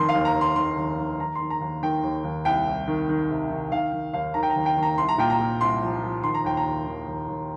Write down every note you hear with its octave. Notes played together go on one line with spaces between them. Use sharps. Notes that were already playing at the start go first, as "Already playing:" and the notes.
Already playing: F1 D#3 C6
F5
D#2
A#5
D#2
C6
D#3 C6
D#2
D#3
D#3 A#5
C6
D#3
A#5
D#2
D#3 G5
D#2
D#2
C2 G5
C2
D#3
D#3
C3
D#3
D#3 F5
D#3
D#2 F5
D#3 A#5
G5
A#5
D#2
G5
D#3
A#5
C2 C6
A#5
A#2 G5
A#5
A#2
C2 C6
F3
F3
D#3 C6
A#5
D#2 G5
A#5
D#2
D#3
D#2
D#2